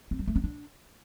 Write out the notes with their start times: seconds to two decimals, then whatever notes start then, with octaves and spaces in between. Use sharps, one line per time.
0.11 C4
0.19 F#3
0.27 A3
0.36 C#4
0.44 D4